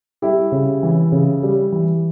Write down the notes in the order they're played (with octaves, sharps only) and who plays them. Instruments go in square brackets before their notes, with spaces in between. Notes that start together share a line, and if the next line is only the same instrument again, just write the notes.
[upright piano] G3 E4 G4
C#3
E3
C#3
G3
E3